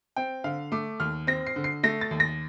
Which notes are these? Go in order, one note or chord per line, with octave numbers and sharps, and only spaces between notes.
C4 G5
D3 F5
A3 D6
D#2 F6
C4 A#6
C7
D3
C7
A3 A#6
A6
D#2
A#6